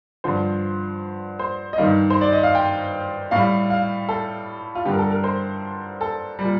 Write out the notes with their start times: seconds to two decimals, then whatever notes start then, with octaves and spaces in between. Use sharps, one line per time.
0.24 G2 D3 F3 C5
1.39 C5
1.73 D#5
1.78 G2 D#3 G3 F5
2.10 C5
2.21 D5
2.32 D#5
2.43 F5
2.55 G5
3.31 A2 G3 F5
3.70 F5
4.09 A4
4.75 F4
4.85 G2 D3 G3 G4
4.93 A#4
4.99 A4
5.11 A#4
5.24 C5
6.01 A4
6.39 G3
6.44 A#2